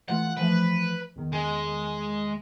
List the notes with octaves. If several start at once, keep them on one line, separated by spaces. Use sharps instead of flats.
E3 A3 F4 F#5
E3 F3 A3 B4
E2 D#3
G#3